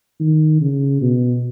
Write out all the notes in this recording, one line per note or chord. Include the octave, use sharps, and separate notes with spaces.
D#3
C#3
B2